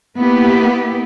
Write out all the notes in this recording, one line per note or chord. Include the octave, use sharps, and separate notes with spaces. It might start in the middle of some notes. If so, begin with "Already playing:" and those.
A#3 B3 E4 G4 B4